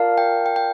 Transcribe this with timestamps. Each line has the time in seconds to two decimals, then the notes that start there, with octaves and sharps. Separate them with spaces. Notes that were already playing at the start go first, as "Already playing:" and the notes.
Already playing: F4 A#4 D5 F5 A5
0.18 G5
0.46 G5
0.56 G5